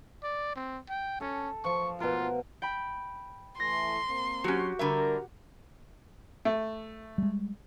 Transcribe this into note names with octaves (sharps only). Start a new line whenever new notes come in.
D5
C4
G5
C#4 A4
F3 C#6
B2 F4 A#4
G5 B5
E3 A3 C6 A#6
A#3 C4
F#3 C#4 F#4 G4
D3 G3 A#4 E5
A3
G3 G#3